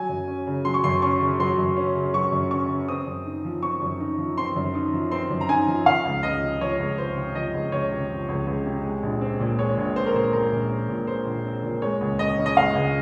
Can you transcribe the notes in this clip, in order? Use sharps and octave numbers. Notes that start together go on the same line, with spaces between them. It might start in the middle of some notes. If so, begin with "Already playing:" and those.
Already playing: F#3 G#5
F#2
C#4
C#3
F#3 C6
C#6
F#2 C6
C#4 C#6
C#3
F#3 C6
F#2
C#4
C#3
F#3 C#6
F#2
C#4 C#6
C#3
C4 D#6
F#2
D#4
F3
C4 C#6
F#2
D#4
F3
C4 C6
F#2
D#4
F3
C4 C6
F#2
A#5
D#4 G#5
F3
F3 F5
C#2
C#2 D#5
C3
F3 C#5
C#2
C#2 C5
C3
F3 D#5
C#2
C#2 C#5
C3
F3
C#2
C#2
C3
G#3
A#1
C4
A#2
G#3 C#5
A#1
C4 C5
A#4
A#2 C5
G#3 A#4
A#1
C4
A#2
G#3 C5
A#1
C4
A#2
G#3 C#5
C#2
C#2 D#5
C#3
D#5
G#3 F5
C#2